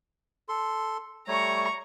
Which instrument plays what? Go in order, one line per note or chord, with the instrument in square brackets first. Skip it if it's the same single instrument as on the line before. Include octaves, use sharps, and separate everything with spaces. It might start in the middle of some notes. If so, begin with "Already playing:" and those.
[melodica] A4 C6
[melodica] G3 A3 C#5 [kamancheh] A#5 C#6